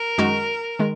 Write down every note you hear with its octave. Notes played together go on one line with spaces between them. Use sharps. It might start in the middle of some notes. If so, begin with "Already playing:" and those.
Already playing: A#4
F#2 D#3 G#3 D#4 F#4
D#3 G#3